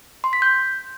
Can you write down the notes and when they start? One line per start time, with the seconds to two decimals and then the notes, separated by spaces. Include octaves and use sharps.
0.24 C6
0.33 B6
0.42 G6